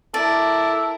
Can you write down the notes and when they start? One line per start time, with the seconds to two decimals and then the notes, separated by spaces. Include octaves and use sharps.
0.14 E4 A4 A#4 D5